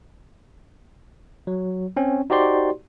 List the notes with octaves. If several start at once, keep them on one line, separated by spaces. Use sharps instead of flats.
F#3
C4 C#4
D#4 F#4 G4 C5 D5 C6